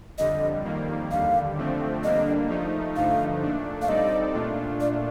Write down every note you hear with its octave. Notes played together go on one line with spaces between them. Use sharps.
F2 D3 G3 D#5
F2 D#3 G3 A#3
D#2 D3 G3 F5
D3 F3 A3 C4
D3 G3 A#3 D4 D#5
F3 A3 D#4
G2 D3 F3 A3 D#4 F5
A#2 A3 D4
F5
G3 C4 D#4 A4 D5 D#5
A#2 A3 D4 F4
D5